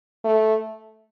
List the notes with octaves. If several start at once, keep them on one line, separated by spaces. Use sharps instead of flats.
A3